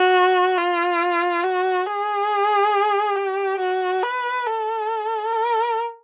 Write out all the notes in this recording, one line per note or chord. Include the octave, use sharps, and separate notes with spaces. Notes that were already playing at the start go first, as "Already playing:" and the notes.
Already playing: F#4
F4
F#4
G#4
G4
F#4
B4
A4
A#4